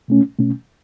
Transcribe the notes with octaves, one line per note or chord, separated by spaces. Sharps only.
B2 A3 C#4
B2 A3 C#4